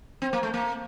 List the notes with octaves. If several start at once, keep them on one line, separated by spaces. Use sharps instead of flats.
C4
A#3
A3
A#3